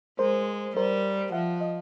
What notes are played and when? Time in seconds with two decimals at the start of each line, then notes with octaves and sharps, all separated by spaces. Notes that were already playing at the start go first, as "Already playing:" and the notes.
0.19 G#3 A#4 C5
0.76 G3 A#4 C5
1.32 F3 E5 F#5
1.61 D#5 F5